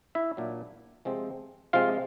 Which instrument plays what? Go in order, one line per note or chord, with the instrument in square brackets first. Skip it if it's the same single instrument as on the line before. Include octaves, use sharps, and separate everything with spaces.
[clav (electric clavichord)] E4 E5
A#2 F#3 A#3 D4
C3 F3 G#3 C4
C3 F3 G#3 C4 F4 F5